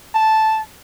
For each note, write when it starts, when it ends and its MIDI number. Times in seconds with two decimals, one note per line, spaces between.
0.15 0.60 81